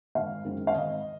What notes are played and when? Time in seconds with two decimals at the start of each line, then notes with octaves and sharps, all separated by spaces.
0.15 G#1 F5
0.45 F#2 D#3 G#3 C4
0.67 F5
0.74 G#1 D#5